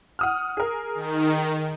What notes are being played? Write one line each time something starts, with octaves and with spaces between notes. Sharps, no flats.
F#5 D#6 F6
G#4 A#4
D#3